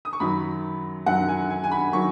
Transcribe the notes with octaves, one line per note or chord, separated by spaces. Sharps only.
D#6
C#6
F#2 D#3 F#3 B5
F#2 D#3 F#3 F#5
G#5
G#5
G#5
B5
D#3 F#3 C#6